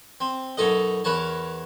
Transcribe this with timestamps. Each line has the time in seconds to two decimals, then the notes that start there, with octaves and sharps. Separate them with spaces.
0.21 C4
0.57 F#2 B2 D#4 A4 D#5
1.04 E2 A#4 B4 C#5 A5